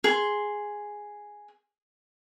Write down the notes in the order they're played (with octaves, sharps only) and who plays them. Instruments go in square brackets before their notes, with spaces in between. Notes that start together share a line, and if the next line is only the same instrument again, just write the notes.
[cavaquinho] G#4 C6